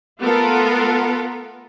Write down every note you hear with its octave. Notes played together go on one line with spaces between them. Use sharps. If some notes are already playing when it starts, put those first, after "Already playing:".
A3 B3 F4 A4 A#4